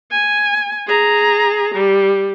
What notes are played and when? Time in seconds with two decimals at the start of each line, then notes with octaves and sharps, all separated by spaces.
0.11 G#5
0.87 G#4 A#5
1.75 G3